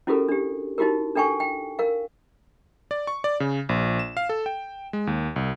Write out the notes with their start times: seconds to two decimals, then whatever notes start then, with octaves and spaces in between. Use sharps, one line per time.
0.07 C#4 E4 F#4 G4 A4 A#4
0.29 D4 G4
0.78 D#4 E4 F#4 G4 A#4
1.15 D4 A4 G5 G#5 C#6
1.40 G5
1.79 A#4 F5
2.91 D5
3.07 C#6
3.24 D5
3.40 C#3
3.69 A#1
3.99 E7
4.17 F5
4.29 A4
4.46 G5
4.93 G#3
5.07 D#2
5.36 C2